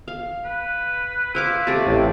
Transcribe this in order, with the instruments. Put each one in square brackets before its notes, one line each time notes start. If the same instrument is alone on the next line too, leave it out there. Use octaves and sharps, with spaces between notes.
[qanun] F5
[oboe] B4
[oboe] E4 [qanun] C5 F5 D6
[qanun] C3 A3 [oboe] D5
[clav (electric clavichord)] A1